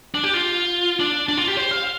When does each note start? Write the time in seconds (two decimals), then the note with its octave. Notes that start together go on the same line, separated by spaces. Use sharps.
0.14 D4
0.24 G4
0.34 F4
1.00 D4
1.28 D4
1.37 F4
1.48 G4
1.57 C5
1.71 F5